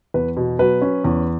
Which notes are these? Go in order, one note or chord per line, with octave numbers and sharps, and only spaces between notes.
E2 B4
B2
F#3 B4
C#4
E2